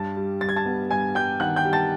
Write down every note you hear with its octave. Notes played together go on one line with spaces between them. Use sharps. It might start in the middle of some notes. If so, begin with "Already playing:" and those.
Already playing: G2 A5 A6
G3
G2 A6
G#6
A5 A6
B3
G2 G#5 G#6
G3 G5 G6
D#3 F#5 F#6
G5 G6
G3
A5 A6